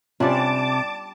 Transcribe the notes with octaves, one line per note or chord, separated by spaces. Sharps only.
C3 G3 C#4 D4 F4 D5 A5 D6